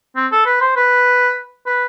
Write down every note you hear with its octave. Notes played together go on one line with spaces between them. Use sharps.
C4
A4
B4
C5
B4
B4